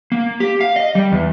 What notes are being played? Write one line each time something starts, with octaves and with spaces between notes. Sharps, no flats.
A#3
G4
F5
D#5
G3
E2